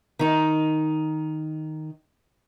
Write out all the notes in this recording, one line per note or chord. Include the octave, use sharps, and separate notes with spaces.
D#3 D#4